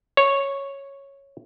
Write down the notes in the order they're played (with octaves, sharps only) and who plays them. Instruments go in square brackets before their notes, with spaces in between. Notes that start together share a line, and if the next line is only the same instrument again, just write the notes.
[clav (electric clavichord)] C#5